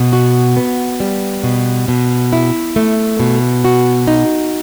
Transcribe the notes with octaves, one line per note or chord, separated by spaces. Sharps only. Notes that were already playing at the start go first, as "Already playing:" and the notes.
Already playing: B2
F#4
B3
G3
B2
B2
E4
A3
B2
F#4
D#4